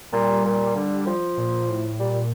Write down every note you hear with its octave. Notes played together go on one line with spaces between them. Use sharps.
A#2 G3
A#2
D3
F3
A#2
A2
A#2 G3